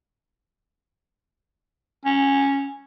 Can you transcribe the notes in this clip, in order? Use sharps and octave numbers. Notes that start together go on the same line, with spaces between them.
C#4